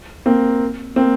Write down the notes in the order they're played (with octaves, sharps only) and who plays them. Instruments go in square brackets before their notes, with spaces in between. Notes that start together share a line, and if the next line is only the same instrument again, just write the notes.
[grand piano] A#3 C4
A#3 C4